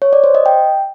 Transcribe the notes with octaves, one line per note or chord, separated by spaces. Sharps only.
C#5
D5
C5
D#5
G5